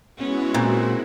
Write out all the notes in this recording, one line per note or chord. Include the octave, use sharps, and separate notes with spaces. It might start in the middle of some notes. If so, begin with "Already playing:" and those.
G#3 B3 C#4 E4 F#4
A#2 A#3 C4